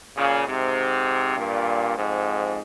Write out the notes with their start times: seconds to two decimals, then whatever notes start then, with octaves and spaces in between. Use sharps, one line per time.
0.17 A#2 C#3
0.47 G#2 C3
1.37 G2 A#2
1.98 F2 G#2